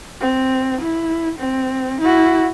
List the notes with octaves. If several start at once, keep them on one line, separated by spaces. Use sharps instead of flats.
C4
E4
C4
E4 F#4